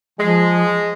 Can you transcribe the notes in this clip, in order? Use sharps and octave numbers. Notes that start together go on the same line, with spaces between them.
F3 G#3